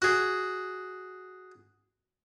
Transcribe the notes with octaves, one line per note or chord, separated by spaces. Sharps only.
F#4 G#4